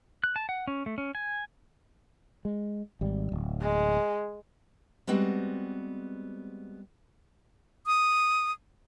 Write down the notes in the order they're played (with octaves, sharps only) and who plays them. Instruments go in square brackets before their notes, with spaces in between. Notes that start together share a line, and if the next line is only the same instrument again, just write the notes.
[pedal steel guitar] F#6
A5
F#5
C#4
A3
C#4
G#5
[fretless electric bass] G#3
G#1 G3
D1
[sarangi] G#3
[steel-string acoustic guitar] G3 G#3 B3 C4 F#4
[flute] D#6